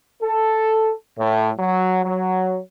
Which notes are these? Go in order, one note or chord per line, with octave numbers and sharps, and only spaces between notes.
A4
A2
F#3
F#3